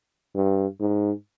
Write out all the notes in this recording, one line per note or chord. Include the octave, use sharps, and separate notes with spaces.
G2
G#2